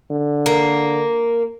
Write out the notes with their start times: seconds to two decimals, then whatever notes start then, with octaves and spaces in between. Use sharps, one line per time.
0.11 D3
0.46 A#3